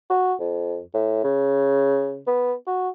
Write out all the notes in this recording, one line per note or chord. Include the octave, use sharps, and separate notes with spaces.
F#4
F2
A2
C#3
B3
F#4